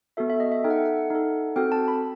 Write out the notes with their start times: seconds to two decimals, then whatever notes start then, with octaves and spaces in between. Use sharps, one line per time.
0.17 B3 F#4 A4 E5
0.30 E5
0.40 D#5
0.52 E5
0.64 D#4 A4 G5
0.70 F#5
0.78 E5
0.85 F#5
1.10 D#4 A4
1.56 C4 F#4 A4 G5
1.72 A5
1.88 B5